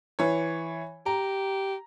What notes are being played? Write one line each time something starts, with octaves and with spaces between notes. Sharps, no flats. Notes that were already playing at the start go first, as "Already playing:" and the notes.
E3 C#5
G4 A#5